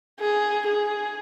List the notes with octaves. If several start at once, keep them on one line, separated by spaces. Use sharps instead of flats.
G#4
G#4